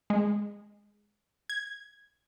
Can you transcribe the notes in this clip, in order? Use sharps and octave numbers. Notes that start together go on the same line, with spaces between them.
G#3
G#6